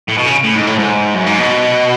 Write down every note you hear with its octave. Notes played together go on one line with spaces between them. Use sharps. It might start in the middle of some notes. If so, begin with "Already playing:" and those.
A2
B2
C#3
A2
G#2
A2
G#2
F#2
G#2
B2